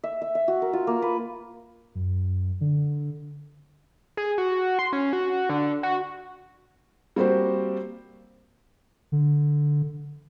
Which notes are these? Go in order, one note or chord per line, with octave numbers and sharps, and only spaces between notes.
E5
E5
E5
F#4
A#4
F4
A#3
B4
F#2
D3
G#4
F#4
C6
C#4
F#4
D3
F#4
G3 A#3 C4 F#4 G4 C5
D3